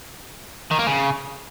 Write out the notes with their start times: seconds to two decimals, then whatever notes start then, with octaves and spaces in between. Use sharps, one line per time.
0.71 D#3
0.79 A#3
0.87 C#3